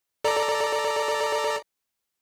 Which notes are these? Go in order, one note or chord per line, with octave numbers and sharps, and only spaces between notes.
A4 D5 A#5